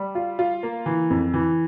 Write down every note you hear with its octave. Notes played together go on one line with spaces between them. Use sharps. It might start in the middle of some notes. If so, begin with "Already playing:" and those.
Already playing: G3
F4
F4
A#3
E3
F2
E3